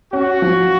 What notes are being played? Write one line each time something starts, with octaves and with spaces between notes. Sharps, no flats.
C#4 F#4
F3